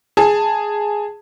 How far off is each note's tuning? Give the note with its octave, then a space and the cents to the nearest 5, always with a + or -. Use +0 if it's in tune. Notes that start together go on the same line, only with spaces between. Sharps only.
G#4 +0 A5 +10